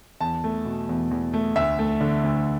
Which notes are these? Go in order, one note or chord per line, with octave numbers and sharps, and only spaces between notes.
E2 A5
A3
B2
E2
E2
A3
D2 E5
A3
D3
D2